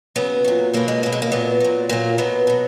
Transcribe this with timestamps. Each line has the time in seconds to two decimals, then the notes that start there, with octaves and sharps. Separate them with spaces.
0.16 C#3 F#3 B3
0.44 A#2 F#3
0.73 B2 F#3 A#3
0.88 G#3
1.03 B2 F#3 A#3
1.12 G#3
1.22 A#3
1.32 A#2 F#3 B3
1.60 A#2 F#3
1.89 A#2 F#3 A#3
2.18 B2 F#3 B3
2.47 B2 F#3